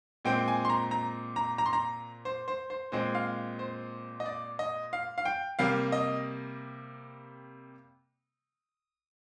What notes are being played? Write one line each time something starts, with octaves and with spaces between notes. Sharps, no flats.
A#2 G#3 C4 G5
G#5
C6
A#5
A#5
A#5
A#5
C6
A#5
C5
C5
C5
A#2 G#3 C4 C5
F5
C5
D#5
D5
D#5
F5
F5
G5
C3 G3 A#3 F5
D#5